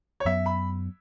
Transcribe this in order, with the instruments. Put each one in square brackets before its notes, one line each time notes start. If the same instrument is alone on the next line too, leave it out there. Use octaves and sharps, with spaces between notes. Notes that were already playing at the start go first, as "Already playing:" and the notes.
[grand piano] C#5
[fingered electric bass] F#2 F#3 B3 [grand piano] E5
[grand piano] B5